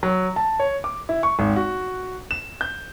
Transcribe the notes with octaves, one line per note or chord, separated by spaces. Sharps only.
F#3
A5
C#5
D6
E4
C#6
G#1
F#4
E7
G6